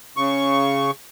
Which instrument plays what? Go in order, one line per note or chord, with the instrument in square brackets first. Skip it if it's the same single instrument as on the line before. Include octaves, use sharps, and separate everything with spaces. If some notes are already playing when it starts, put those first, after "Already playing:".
[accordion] C#3 C#6